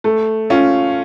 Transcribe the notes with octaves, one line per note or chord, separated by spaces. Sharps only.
A3
C#4 F4